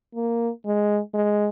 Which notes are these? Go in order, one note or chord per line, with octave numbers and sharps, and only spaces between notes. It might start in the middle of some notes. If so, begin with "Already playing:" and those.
A#3
G#3
G#3